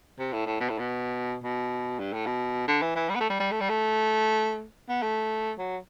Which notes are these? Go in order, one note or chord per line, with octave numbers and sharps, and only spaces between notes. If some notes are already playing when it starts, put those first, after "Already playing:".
C3
A2
A2
B2
A2
B2
B2
G2
A2
B2
D3
E3
E3
G3
B3
A3
G3
G3
A3
G3
A3
B3
A3
F#3